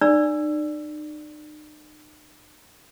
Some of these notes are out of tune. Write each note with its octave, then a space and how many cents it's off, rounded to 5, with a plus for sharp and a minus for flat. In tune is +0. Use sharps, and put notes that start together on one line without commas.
D#4 -40 D5 +0 E6 +20